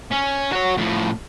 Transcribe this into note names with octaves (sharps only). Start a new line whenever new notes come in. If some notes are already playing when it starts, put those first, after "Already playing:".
C#4
F#4 C#5
A2 F3